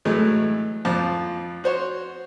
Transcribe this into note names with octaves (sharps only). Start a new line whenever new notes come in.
A2 E3 F#3 G#3 A3
F2 F3 D6
F#4 C5 C#5